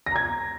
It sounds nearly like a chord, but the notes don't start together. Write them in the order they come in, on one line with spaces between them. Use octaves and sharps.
A#6 A#5 G#6